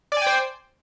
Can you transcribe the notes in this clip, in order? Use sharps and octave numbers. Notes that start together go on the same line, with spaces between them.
C5 D5 G5 G#5